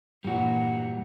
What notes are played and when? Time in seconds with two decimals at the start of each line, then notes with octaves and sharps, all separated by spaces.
0.24 G2 A#2 E3 G3 F#4